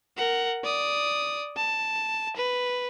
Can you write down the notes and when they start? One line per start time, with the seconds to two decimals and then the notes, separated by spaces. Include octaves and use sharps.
0.17 A#4 F#5
0.64 D5 D#6
1.56 A5
2.36 B4